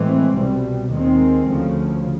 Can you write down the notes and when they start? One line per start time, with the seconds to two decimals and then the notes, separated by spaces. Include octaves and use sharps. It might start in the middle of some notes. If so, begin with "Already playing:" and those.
Already playing: A2 E3 G#3 C4
0.35 C2 B2 G3
0.92 D#2 D#3 G#3 C4
1.48 D2 C#3 F3